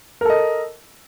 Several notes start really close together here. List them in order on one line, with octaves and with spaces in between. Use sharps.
A#4 A4 D#5